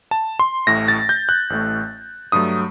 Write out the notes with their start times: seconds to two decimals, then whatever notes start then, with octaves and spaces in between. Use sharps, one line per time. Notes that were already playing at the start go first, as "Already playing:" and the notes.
0.11 A5
0.40 C6
0.67 A1 A2 A3 A#6
0.88 A6
1.09 G6
1.29 F#6
1.50 A1 A2 A3
2.32 G2 F#3 A3 D#6